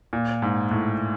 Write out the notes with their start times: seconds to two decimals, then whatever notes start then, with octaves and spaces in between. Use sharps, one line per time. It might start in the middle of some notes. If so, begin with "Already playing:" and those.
0.13 A#2
0.42 G#2
0.71 A2